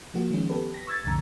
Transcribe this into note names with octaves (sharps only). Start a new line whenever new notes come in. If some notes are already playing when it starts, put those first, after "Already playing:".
F3 A#3 F#4
D#3 F3 G#3 C#4
B3 G4 A4 B4
A#6 B6
C#6 E6 G#6 A6
B1 F2 A2 D3 A#5